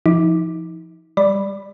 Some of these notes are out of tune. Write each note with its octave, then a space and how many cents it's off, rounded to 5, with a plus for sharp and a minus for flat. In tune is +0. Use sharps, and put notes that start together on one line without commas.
F3 -25 D#4 +40 D6 +0
G3 +25 D5 +0 B5 +0